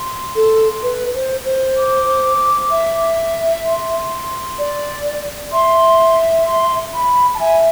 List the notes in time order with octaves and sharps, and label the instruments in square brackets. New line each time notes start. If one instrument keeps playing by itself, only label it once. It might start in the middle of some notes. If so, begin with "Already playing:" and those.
Already playing: [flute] C6
[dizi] A4
B4
C5
C5
[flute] D6
[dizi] E5
[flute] C6
[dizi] D5
[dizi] E5 [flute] C6
[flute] C6
B5
A5
[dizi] E5 [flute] G#5